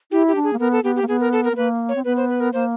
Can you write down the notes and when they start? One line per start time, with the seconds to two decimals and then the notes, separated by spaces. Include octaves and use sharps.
0.11 E4 G4
0.28 G4
0.35 D4
0.44 G#4
0.53 A#3
0.59 B3 A#4
0.72 A4
0.83 B3 G4
0.96 G4
1.02 A#3
1.08 B3 G#4
1.20 A#4
1.32 A4
1.44 A#4
1.52 B3
1.56 A#3 B4
1.89 C#5
1.95 C4
2.05 B3 B4
2.17 C5
2.29 B4
2.40 A#4
2.53 A#3 C5